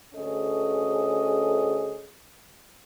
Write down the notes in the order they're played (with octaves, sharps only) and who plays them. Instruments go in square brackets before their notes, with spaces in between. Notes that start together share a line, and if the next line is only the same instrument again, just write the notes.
[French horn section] D2 C#4 G#4 A4 D#5